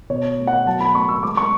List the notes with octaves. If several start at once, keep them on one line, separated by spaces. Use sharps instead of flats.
B2 C#5
A3
F#5
F#3 A5
B5
A3 C#6
E6
G#3 D6
C#6